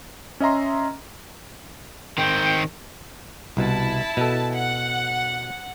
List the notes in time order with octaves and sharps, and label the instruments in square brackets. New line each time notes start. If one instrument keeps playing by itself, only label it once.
[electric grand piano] C#4 D#5 E5 A#5 C6
[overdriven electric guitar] D#3 C4 [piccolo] G5
[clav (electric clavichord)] C2 B2 [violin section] E4 A5
[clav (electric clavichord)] B2 A4
[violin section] F#5